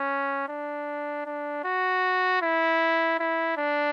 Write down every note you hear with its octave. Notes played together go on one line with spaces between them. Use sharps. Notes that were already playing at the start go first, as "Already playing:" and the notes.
Already playing: C#4
D4
D4
F#4
E4
E4
D4